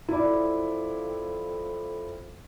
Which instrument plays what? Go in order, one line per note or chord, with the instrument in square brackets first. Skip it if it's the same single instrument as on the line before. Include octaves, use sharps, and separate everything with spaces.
[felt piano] E4 D5
[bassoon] F2